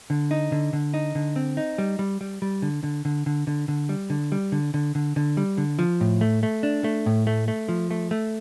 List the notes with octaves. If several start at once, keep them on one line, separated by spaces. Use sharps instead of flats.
D3
D#4
D3
D3
D#4
D3
C4
D#4
G3
G3
G3
G3
D3
D3
D3
D3
D3
D3
G3
D3
G3
D3
D3
D3
D3
G3
D3
F3
A2
A3
A3
D4
A3
A2
A3
A3
F3
A3
A3